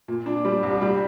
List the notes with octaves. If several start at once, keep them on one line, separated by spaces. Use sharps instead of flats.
A#2
D4
G3
C2
G3